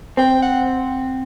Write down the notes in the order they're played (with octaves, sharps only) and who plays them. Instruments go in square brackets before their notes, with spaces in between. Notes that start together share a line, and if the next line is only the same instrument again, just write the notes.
[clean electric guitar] C4 [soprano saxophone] G5
[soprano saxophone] F#5